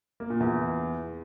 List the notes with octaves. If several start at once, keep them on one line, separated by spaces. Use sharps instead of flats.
A#3
A#2
E2